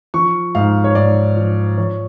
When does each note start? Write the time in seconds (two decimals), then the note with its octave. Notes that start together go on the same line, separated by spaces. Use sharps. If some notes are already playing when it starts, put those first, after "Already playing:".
0.14 F3 C#6
0.55 G#2 F5
0.84 C#5
0.95 G#2 D5
1.37 F3
1.78 F3 C#5